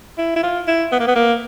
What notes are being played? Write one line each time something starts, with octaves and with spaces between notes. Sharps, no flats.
E4
E4
F4
E4
B3
A#3
B3
A#3